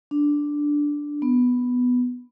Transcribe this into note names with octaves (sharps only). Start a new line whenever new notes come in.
D4
B3